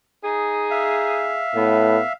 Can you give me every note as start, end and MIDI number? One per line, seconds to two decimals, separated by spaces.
0.25 1.45 63
0.25 1.45 68
0.71 2.13 76
0.71 2.13 77
1.55 1.97 45
1.55 2.02 59